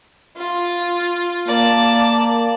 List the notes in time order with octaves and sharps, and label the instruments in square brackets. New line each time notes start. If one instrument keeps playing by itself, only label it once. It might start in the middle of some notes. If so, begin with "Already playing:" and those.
[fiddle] F4
[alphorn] A#3 [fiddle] D5 A5